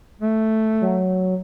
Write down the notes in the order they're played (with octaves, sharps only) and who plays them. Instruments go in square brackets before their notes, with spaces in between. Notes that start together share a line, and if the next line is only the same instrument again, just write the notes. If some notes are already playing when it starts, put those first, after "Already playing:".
[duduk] A3
[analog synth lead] F#3